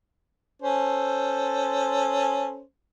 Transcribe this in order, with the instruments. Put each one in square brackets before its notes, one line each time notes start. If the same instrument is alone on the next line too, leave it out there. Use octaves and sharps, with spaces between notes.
[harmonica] C#4 A4 C5